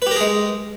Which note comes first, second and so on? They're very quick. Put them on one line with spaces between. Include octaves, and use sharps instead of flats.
B4 G4 A#4 G#4 G#3